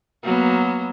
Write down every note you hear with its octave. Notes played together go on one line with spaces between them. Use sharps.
F#3 A#3 B3